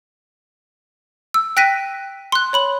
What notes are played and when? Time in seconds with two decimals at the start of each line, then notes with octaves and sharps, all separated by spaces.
1.34 E6
1.57 G5 F#6 A#6 B6 D#7
2.32 C6 F#6
2.53 C#5 B5 F#7